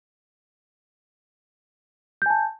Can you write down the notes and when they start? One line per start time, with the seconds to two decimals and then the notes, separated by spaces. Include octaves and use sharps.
2.22 G6
2.26 G#5
2.30 A5